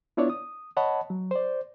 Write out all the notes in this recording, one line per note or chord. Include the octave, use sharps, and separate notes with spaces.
B3 D4 E4 F4 C#5 D5
D#6
C#5 D#5 F#5 A5 B5
F#3
C5 D5